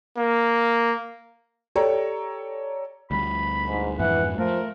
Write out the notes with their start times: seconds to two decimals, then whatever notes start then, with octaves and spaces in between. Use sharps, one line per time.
0.17 A#3
1.75 G4 A4 C#5 D5 A#5
3.11 D2 G3 B5
3.66 G#2
3.99 F2 G#2 E3 F#5
4.38 F3 A3 A#4